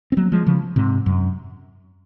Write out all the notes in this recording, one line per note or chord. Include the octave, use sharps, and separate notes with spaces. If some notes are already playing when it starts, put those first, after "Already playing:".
C4
F#3 A#3
F3 G#3
C#3 F3
G#2 C3
F#2